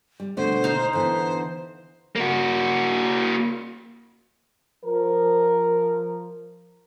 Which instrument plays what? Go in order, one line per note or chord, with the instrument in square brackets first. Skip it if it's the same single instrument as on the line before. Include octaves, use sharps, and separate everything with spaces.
[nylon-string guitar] G3
[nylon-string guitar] B2 D3 A3 [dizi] C5
[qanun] D#4 F5
[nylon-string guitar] D3 E3 B3 [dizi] C5
[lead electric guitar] A#3 F#4
[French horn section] F3 A#4